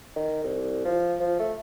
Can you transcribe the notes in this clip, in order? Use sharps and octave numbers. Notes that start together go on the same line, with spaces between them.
D#3
C2
F3
F3
A3